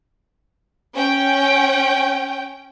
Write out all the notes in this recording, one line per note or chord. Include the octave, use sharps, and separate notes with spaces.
C#4 G5